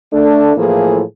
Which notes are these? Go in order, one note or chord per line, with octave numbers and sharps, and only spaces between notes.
A3 D4 A4
A2 E3 F3 A#3 G#4 A4